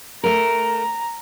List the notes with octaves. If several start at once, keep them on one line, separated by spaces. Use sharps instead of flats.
A3 A#4 A#5